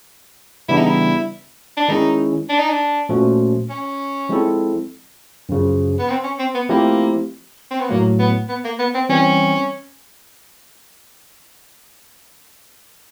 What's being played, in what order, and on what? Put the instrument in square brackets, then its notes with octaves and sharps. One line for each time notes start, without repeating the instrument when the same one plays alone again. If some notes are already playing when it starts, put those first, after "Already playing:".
[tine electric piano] C#3 E3 G3 B3 D4 [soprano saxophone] E4
[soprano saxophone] D#4
E4
D4
[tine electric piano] D#3 G#3 C#4 E4 [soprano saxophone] D#4
[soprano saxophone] D4
D#4
D4
[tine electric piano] A#2 F3 A3 C#4 F#4
[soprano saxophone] C#4
[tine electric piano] F3 G#3 C4 E4 A4
F#2 C#3 F3
[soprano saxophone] B3
C4
C#4
C4
B3
[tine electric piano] F3 A3 C4 E4 G4 [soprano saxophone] A#3
[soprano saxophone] C4
B3
[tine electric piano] A2 F#3 A3 [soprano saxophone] A#3
[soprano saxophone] B3
B3
A#3
B3
C4
[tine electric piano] E3 G3 C4 [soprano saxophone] C#4